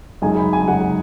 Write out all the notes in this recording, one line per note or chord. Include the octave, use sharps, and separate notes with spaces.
F#2 C#3 G#3 D#4 G#5
B5
G#5
F#2 C#3 G#3 D#4 F#5